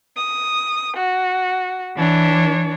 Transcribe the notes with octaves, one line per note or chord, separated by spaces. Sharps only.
D#6
F#4
E3 D4 C#5